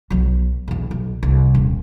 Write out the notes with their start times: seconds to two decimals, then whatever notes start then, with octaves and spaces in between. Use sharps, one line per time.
0.10 B1 F#3
0.68 B1 E2
0.91 B1
1.23 C2
1.55 D#1